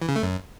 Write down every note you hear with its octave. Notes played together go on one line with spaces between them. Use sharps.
E3
C#3
A3
F#2